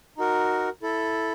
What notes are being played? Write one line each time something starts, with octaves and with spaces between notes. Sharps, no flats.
D#4 F#4 A#4
E4 A4